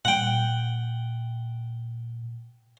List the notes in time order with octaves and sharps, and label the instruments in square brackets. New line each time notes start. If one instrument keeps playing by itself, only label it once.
[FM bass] A#2 [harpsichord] F#5 G5